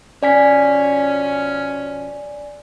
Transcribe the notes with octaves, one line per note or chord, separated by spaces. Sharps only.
B2 F3 C#4 D5 G#5 B6